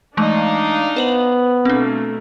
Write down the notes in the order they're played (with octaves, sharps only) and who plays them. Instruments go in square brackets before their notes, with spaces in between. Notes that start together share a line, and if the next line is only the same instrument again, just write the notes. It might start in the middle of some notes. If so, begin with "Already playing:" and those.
[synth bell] E3 G#3 A3 [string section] D4 D#4 F5
[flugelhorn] B3 [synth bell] B4 C5 F#7
[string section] B2 A3 A#3 [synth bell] C4 D4